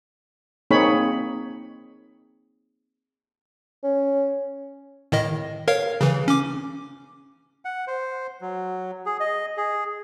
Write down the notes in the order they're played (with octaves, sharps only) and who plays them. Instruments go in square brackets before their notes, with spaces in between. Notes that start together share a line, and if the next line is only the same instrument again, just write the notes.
[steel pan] A#3 C4 D#4 G#4 C#5 B5
[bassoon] C#4
[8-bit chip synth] A2 D#3 D#5
A#4 C#5 F5
C#3 E3
C#4 D6
[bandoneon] F#5
C5
F#3
G#4
D#5
G#4